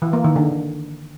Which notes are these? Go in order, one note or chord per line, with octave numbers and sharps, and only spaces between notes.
E3
A#3
D#3
D3